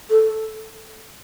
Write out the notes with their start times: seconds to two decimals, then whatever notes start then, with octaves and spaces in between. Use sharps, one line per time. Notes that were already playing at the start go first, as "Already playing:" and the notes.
0.10 A4